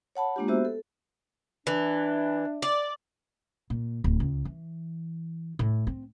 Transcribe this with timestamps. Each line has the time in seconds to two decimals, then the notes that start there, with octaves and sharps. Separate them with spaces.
0.15 C#5 F#5 A5 B5
0.36 G#3 A#3 D4 F4 G4
0.48 B3 F#4 G4 C5 E5 E6
0.65 A4
1.67 E3 D4
2.62 D5
3.70 A#2
4.04 D1
4.20 C#2
4.45 E3
5.59 A2
5.87 C4